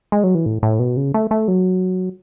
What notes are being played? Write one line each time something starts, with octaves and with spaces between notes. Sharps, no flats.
G#3
F#3
E3
A2
A2
B2
C#3
A3
A3
F#3